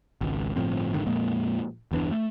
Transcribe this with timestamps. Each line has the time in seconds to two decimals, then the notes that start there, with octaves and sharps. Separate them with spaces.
0.21 G#1 C#2
0.56 G1 A2 F3 C4
0.94 F1 G#2 D3 D#3
1.07 F2 A#2 G#3 A#3
1.91 G1 E2 E3 D4
2.11 A3